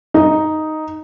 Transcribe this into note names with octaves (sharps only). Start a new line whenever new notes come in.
D#4